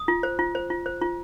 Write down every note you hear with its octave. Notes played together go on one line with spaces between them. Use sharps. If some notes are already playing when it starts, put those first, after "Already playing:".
Already playing: D#6
F4
C5
F4
C5
F4
C5
F4